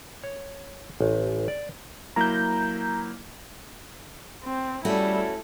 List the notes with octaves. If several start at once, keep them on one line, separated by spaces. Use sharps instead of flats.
C#5
A1
D5
F#3 A#3 E4 A#5 G6
C4
G3 A3 C#4 E4 F#4 A4